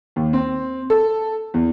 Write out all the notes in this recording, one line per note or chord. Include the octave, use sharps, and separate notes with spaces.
D#2
C4
A4
E2